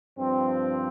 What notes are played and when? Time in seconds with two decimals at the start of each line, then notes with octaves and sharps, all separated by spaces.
0.18 G2 F3 C4